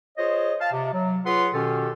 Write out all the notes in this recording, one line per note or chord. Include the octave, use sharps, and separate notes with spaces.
F4 G#4 C5 C#5 D#5
F5 A5
C3
F#3
F4 G#4 B4 C#5 F#5 C6
B2 D#3 C#4 G4 A4